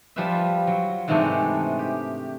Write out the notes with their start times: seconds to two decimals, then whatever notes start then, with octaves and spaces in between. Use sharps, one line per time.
0.16 F3 G3 F4 B4 C5 E5
0.67 F#3
1.08 G#2 C3 E3 G#3 A3 D4
1.79 G4